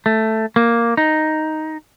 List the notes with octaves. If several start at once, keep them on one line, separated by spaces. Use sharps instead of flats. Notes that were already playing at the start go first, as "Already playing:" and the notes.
A3
A#3
D#4